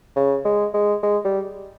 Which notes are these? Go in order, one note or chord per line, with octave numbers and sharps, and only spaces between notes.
C#3
G#3
G#3
G#3
G3